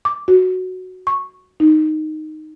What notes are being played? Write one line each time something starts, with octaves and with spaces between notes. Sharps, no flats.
D6
F#4
C#6
D#4